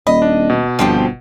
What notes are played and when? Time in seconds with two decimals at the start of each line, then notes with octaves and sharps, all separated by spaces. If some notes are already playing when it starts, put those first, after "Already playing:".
0.07 D#1 D#5 B5
0.22 D4
0.50 B2
0.79 G1 F3 C4 G4